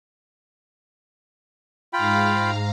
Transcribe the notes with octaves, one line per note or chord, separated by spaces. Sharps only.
G#2 F4 F5 G5 A#5 B5